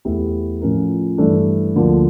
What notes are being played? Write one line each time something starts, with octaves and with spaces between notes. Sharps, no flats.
E2 E3 A3 E4 G4
A2 F3 C#4 F4 A#4
G2 E3 A3 D4 A4
D2 D3 F3 A#3